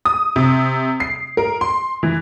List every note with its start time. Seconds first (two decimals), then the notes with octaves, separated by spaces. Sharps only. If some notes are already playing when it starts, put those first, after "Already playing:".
0.05 D#6
0.36 C3
1.00 C7
1.37 A#4
1.61 C6
2.03 E3